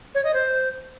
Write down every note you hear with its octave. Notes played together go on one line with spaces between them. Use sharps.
C#5
D#5
C5